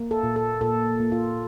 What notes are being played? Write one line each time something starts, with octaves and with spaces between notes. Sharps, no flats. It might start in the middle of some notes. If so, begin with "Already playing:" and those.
Already playing: A#3
A4
A#2
A4
A#2 A4
A#3
F4